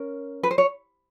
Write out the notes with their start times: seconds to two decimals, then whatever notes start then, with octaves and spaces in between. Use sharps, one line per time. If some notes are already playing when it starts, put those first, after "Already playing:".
Already playing: C#4 A#4
0.43 B4
0.51 C5
0.58 C#5